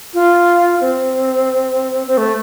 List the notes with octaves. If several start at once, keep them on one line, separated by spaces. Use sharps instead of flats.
F4
C4
C4
A3